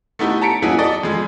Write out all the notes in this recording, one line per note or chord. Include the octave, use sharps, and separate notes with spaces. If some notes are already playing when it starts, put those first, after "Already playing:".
A3 B3 D#4 E4 G4
A5 A#5 B6 C#7 D7
A#2 F#3 B3 D#4 E4 G#4
A4 D5 D#5
F2 G#3